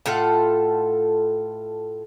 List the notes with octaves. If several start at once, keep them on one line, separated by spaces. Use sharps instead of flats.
A2 F4 A4 F#5